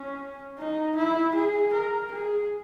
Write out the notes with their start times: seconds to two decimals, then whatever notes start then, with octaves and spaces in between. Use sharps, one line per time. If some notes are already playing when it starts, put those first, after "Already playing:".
Already playing: C#4
0.58 D#4
0.96 E4
1.35 G#4
1.73 A#4
2.12 G#4